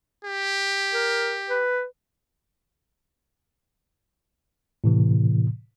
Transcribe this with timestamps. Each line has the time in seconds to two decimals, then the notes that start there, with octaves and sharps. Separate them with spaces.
0.25 G4
0.94 A#4
1.49 B4
4.84 A2 C3 E3